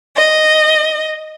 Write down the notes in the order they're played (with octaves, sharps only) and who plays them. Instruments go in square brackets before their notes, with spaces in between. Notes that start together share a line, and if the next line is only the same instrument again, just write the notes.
[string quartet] D#5